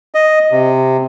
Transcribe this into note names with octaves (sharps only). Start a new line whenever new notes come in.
D#5
C3